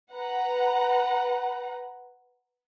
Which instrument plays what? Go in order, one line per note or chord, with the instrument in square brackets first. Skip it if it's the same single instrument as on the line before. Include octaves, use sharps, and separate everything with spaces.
[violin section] B4 F#5 A#5